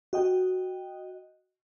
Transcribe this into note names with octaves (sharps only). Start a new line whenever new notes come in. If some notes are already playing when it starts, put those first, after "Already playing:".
F#4 D#5 G5